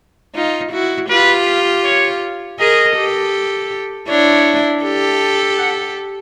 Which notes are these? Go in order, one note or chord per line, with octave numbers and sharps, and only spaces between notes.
D#4 F4
E4 F#4
F4 G4 B4
C#5
G#4 A#4 D#5
G4 A4
D4 E4 C#5
G4 A4
F#5